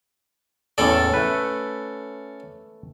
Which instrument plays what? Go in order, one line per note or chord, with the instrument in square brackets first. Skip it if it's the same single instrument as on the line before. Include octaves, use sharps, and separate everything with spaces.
[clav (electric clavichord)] E2 A2 A5 [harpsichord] C#4 A4 D5
[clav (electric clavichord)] A3 B4